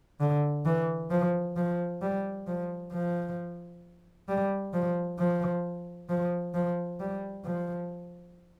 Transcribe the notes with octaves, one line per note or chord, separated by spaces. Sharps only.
D3
E3
F3
F3
G3
F3
F3
G3
F3
F3
F3
F3
G3
F3